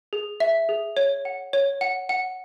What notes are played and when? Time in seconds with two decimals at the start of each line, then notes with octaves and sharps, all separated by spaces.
0.13 G#4
0.40 E5
0.69 G#4
0.97 C#5
1.25 F#5
1.53 C#5
1.81 F#5
2.09 F#5